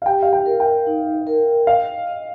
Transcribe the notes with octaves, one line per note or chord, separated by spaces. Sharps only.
F5
G4 G5
F5
G5
A#4
G5
D#4
A#4
D#5 F5
D#5